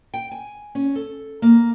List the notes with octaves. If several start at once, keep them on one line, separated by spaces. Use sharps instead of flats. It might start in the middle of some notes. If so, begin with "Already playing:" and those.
G5
G#5
C#4
A4
A#3